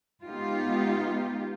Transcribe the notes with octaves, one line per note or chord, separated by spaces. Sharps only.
G#3 B3 D#4 F4 G4